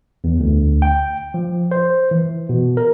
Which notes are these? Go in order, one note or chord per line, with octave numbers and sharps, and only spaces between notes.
E2
D2
G5
F3
C5
E3
B2
A#4